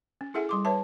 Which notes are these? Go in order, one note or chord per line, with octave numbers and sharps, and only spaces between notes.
C#4
E4 G#4 A4 E5 F#5 G#5
G3 C6 D6
B4 C#5 E5 A5